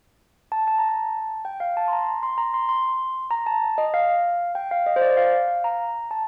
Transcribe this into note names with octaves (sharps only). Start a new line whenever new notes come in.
A5
A5
A#5
A5
G5
F5
A5
C6
A#5
C6
A#5
C6
C6
A#5
A5
D#5
F5
G5
F5
D#5
C5
D5
F5
F5
A#5
A5